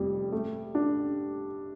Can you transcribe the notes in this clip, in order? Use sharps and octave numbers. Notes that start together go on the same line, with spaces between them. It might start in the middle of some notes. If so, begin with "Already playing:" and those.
Already playing: F1 F2 G3
A3
D4